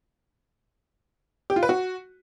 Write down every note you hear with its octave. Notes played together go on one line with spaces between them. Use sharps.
G4
F4
B4
F#4